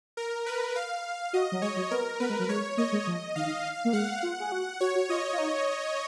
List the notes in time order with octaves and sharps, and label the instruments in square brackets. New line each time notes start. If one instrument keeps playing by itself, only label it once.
[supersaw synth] A#4
B4
F5
[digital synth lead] F#4 [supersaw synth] D#5
[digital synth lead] F#3
[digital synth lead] G#3 [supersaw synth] C#5
[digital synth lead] F#3
[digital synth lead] B3 [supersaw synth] A#4
[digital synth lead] B3 [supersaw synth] B4
[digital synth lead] G#3
F#3
[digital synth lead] G#3 [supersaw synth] C#5
[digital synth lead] A#3 [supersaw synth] D#5
[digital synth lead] G#3
F3
[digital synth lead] D#3 [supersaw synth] F5
[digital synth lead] D#3
A#3
[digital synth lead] G#3 [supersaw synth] F#5
[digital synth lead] F4
G#4
F#4
[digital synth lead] F#4 [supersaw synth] C#5
[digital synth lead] F#4
[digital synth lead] F4 [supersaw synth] D#5
[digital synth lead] F4
D#4